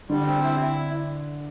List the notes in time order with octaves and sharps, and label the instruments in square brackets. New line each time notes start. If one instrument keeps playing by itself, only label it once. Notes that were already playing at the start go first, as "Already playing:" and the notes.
[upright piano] D3 [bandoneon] G3
[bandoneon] C4
E4
E4